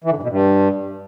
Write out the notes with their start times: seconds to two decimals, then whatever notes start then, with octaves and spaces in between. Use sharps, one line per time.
0.04 E3
0.10 D3
0.17 G2
0.23 B2
0.29 G2